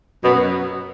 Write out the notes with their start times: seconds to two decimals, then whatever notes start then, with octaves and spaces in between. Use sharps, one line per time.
0.23 F#2 B2 F#3 B3